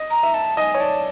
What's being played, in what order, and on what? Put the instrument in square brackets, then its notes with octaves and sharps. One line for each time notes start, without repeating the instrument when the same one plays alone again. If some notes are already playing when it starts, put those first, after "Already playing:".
Already playing: [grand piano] D#5
[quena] A#5
[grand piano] E5
[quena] A5
[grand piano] D#5 [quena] G#5 A5
[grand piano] C#5
[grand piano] D5 [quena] A5